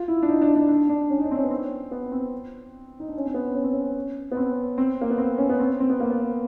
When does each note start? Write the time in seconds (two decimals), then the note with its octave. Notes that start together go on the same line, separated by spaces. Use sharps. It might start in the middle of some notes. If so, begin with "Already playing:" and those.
Already playing: F4
0.08 E4
0.23 D4
0.29 D#4
0.42 D4
0.56 D4
0.68 D4
0.89 D4
1.10 C#4
1.18 D#4
1.24 D4
1.31 C4
1.37 C#4
1.44 B3
1.51 C4
1.91 B3
2.12 C4
3.00 D#4
3.08 D4
3.17 C#4
3.26 C4
3.34 B3
3.55 C#4
3.64 C4
3.73 C#4
4.32 B3
4.37 C4
4.78 C4
5.01 A#3
5.10 B3
5.18 C4
5.38 C#4
5.49 B3
5.59 C4
5.80 C4
5.90 B3
6.00 A#3
6.10 B3